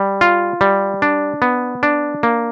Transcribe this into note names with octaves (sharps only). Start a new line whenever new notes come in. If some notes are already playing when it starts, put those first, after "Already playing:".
Already playing: G3
F4
G3
D4
B3
D4
A#3